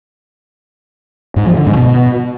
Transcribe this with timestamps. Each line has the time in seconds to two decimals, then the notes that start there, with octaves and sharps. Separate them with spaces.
1.36 G#2
1.46 F3
1.56 D3
1.67 G#2
1.77 B2